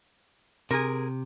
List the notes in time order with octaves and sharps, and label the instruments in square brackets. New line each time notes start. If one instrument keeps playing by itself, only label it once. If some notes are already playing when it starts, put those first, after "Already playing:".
[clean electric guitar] C3 [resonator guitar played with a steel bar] G#4 A#4